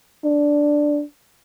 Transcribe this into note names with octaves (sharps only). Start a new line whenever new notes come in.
D4